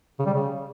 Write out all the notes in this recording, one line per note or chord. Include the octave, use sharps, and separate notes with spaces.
C#3
G3
C#3